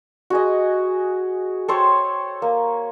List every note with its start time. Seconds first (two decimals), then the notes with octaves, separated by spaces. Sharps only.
0.30 F#4 G#4 D#5
1.68 A4 C5 C#5 G5
2.42 A#3